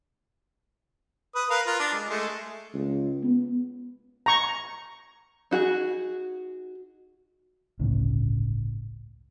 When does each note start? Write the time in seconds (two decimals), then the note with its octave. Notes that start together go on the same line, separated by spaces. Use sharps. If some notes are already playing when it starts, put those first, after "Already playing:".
1.35 B4 D#6
1.50 A#4 B4 F5
1.67 F4 A#4
1.80 D4
1.93 G#3
2.10 G#3 A3
2.74 C#2
3.23 B3
4.26 A#5 C#6
5.51 D#4 F#4 G#4
7.79 G1 C#2 A2 C#3